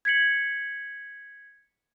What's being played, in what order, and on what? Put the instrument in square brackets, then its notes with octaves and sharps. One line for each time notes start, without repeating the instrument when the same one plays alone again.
[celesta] G#6 B6 C#7 F#7